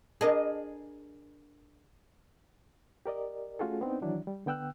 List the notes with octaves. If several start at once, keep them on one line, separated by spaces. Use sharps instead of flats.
D4 G#4 A#4 D#5 A5
G4 A#4 D5 D#5
A3 C#4 F4 F#4 G#4 A4
B3 C4 D4 D#4
D#3 E3 F#3 D4 E4
G3
D3 B3 G5 E6 F#6